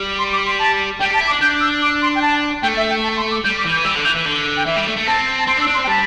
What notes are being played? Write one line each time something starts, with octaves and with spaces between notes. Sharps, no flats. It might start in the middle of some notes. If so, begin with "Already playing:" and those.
Already playing: G3
C6
D6
C6
A5
G3 G5
G4 A5
E4
D6
D4
D4 G6
E6
D6
C6
G5
A5
A3 G5
E5
G5
A5
C6
D6
G3 G6
D6
E3
G6
G3 E6
D3
E3 G6
E3
D3
G5
E3 E5
G3
A3
A3
C4 A5
A5
C4 C6
D4
E6
D4
C6
C4
G5
G3 A5